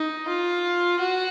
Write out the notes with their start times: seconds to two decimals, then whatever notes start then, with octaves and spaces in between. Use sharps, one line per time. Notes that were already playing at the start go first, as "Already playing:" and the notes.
Already playing: D#4
0.28 F4
0.99 F#4